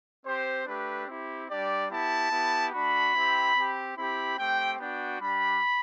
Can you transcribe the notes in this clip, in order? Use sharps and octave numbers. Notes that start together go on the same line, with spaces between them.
C4 G4 C5
A3 D4 G4 B4
C4 E4 G4
G3 D4 G4 D5
B3 E4 G4 A5
B3 E4 G4
A3 D4 F#4 B5
C4 E4 G4
C4
G4
C4 E4 G4 B5
A3 C4 G4 G5
B3 D4 F#4 G5
G3 D4 G4 B5